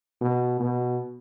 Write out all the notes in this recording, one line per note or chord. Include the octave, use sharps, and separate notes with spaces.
B2
B2